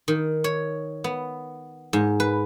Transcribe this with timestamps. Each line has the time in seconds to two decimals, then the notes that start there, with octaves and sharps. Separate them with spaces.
0.08 D#3
0.44 C#5
1.04 B3
1.93 G#2
2.20 B4